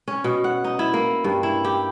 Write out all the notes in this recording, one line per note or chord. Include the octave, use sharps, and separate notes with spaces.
C#4
B2
F#5
D#4
E4
A#3
G2
E4
G4